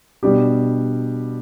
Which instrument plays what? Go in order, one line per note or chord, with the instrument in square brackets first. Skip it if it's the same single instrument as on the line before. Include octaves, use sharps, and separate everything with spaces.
[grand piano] B2 G3 D4 G4